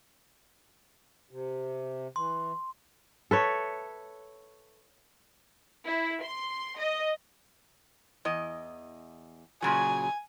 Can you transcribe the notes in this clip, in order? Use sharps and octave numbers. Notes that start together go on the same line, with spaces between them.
C3
E3 C6
A4 B4 C#5 E5
E4
C6
D#5
E2 D#5
A#2 C#3 F#3 G#5